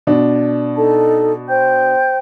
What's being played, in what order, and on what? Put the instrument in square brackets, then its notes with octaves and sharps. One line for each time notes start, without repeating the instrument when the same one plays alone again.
[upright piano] B2 D4
[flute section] D#4 A4 A5
C5 G5 G6